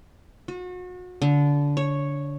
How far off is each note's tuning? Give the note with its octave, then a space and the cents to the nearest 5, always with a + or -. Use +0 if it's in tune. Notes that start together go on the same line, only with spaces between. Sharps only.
F#4 -35
D3 -25
C#5 -5